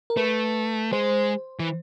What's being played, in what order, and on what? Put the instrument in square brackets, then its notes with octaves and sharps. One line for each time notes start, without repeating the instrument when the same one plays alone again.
[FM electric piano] A#4
[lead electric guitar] A3 [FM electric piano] B4
[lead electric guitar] G#3 [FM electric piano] C5
[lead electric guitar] E3